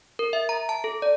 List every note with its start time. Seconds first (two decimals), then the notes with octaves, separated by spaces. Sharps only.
0.19 A#4
0.33 E5
0.49 A#5
0.69 A5
0.84 A4
1.02 D5